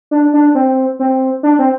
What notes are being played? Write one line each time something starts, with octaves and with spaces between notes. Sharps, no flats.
D4
D4
C4
C4
D4
C4